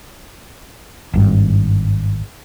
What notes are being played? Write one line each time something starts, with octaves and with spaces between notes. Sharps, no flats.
G#1 G2